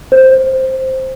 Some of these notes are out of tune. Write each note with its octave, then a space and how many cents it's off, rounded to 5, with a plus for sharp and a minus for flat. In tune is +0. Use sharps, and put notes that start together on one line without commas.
C5 +5